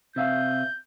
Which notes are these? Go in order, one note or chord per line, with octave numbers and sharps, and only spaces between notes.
C3 E5 F5 G6